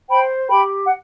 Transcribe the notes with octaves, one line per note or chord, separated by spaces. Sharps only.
C5 G5 B5
G4 G5 B5
F#5